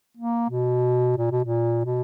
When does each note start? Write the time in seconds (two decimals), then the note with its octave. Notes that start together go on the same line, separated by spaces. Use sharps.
0.17 A#3
0.50 B2
1.18 A#2
1.31 B2
1.44 A#2
1.85 B2